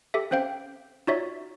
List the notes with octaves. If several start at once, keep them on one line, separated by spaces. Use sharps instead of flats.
G4 A4 E5
C4 C#4 C5 F5 G5
D#4 F4 F#4 C#5 D5 E5